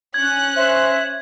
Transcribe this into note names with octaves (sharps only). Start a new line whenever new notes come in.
C#4 F#6 G#6
C5 E5